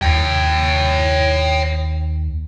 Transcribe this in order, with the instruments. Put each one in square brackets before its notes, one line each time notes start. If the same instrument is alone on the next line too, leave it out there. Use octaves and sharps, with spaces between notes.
[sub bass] D#2 [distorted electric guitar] C#5 G5